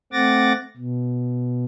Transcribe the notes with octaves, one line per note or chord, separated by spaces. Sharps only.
A3 C4 F#5 D6 A6 A#6
B2